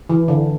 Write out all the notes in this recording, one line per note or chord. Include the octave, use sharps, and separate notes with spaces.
E3
D3